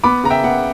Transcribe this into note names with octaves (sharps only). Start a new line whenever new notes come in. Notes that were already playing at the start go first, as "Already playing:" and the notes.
B3 B5 D6
C#3 A#5
E5 G5
B3 F#5